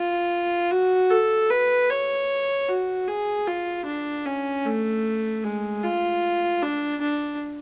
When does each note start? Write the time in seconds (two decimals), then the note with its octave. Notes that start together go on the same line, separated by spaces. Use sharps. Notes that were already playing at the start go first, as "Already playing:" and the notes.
Already playing: F4
0.71 F#4
1.11 A4
1.50 B4
1.90 C#5
2.68 F#4
3.08 G#4
3.47 F4
3.86 D4
4.26 C#4
4.66 A3
5.44 G#3
5.84 F4
6.62 D4
7.02 D4